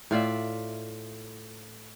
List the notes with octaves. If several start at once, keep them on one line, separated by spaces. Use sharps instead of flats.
A2 F4 D5 E5